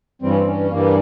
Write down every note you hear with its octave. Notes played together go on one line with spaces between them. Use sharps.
G2 E3 G3 C4
C#4
C4
C#4
G2 E3 G3 A#3